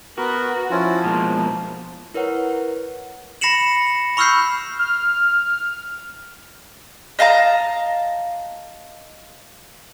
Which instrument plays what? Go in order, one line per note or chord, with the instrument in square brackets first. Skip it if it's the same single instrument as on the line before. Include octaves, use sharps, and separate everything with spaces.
[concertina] B3 A#4 B4 [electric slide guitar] F#4
[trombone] F3 [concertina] C#4 E4 F4
[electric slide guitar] B2 G#3 [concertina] A#3
[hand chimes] E4 A#4 B4 C#5 F#5
[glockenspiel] B5 A#6 C7 C#7 E7 F#7
B5 C#6 E6 F6 G6 C7
[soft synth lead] F6
[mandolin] D#5 F5 A5 A#5